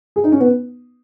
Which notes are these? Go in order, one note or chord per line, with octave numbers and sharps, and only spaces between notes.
G#4
D#4
C#4
B3